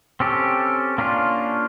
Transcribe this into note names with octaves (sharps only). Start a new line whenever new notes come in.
C4 C#4 G4 A4
A#3 C#4 D4 F4